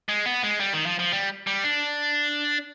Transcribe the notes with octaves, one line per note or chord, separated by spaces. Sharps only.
G#3
B3
G#3
G3
D#3
F3
F3
G3
G3
D4